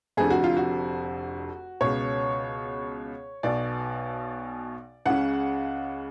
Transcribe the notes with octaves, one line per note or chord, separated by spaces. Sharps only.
F1 F2 D3 G#4
F#4
F4
F#4
C#2 B2 C#5
B1 B2 D5
C#2 C#3 F#5